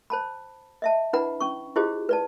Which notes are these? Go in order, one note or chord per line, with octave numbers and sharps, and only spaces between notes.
C5 A5 B5
D#5 E5 A5
D4 E4 B4 F#5 A#5 B5
C#4 C#6
E4 F4 G4 G#4 C5 D#5
B4 D5 A5